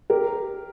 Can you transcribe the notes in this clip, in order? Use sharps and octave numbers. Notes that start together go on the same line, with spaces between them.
G4 A#4